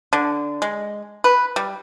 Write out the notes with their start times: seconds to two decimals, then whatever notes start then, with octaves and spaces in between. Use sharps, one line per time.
0.13 D3
0.62 G#3
1.24 B4
1.56 G3